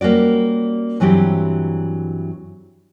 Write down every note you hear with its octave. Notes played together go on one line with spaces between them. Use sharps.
G3 A#3 C#4 F#4 D5
G2 E3 F#3 C4 G4